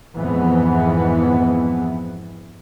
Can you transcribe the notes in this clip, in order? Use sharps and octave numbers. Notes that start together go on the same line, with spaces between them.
F2 G#2 E3 G#3 B3